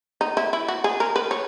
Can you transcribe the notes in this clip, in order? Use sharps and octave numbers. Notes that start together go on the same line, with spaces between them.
D#4
E4
E4
F#4
G#4
A#4
B4
C#5